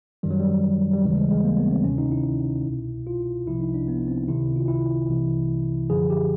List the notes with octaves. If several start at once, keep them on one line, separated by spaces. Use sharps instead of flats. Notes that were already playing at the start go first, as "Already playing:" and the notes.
F#2 D#3 G3
F#3
G3
G3
D#2 C#3 E3 G#3
G3
G#3
G#3
A#3
B3
C4
D2 C3 D#3 C#4
D#4
E4
C2 B2
F4
C2 C3 F3 E4
D#4
D4
B3
C4
C#2 C3 D#3 E4
F4
E4
C2 C3 E3
F#2 D3 F3 G#4
G4